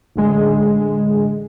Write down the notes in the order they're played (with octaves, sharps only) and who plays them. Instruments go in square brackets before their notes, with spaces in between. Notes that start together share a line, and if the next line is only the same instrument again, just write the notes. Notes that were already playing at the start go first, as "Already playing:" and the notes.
[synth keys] A1 D3 G#3